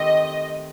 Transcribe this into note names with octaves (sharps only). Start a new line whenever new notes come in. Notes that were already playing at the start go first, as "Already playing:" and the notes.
Already playing: D#3 A3 C4 G4 D#5